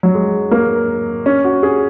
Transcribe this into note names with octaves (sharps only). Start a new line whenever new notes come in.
F#3
G#3
A#3
C#4
F#4
G#4